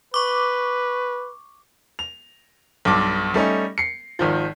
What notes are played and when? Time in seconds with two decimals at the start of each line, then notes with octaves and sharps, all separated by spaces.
0.14 B4 C#6 D6
1.99 F7
2.85 B1 G2 D6
3.34 G3 A3 C#4 D#4
3.78 C7 C#7
4.19 G#1 D#3 F3